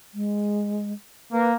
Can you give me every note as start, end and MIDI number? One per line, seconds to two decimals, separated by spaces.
0.14 0.93 56
1.32 1.55 58
1.32 1.50 71